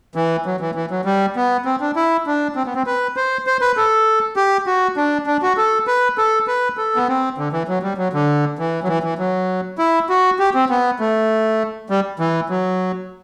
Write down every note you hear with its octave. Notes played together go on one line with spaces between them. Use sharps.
E3
F#3
E3
E3
F#3
G3
B3
C4
D4
E4
D4
C4
B3
C4
B4
C5
C5
B4
A4
G4
F#4
D4
D4
F#4
A4
B4
A4
B4
A4
B3
C4
D3
E3
F#3
G3
F#3
D3
E3
F#3
E3
E3
F#3
E4
F#4
G4
C4
B3
A3
G3
E3
F#3